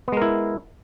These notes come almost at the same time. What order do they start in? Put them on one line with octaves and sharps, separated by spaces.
B3 G#3 A#4 E4